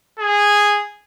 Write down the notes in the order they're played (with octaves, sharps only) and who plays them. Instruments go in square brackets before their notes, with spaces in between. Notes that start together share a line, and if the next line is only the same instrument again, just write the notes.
[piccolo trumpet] G#4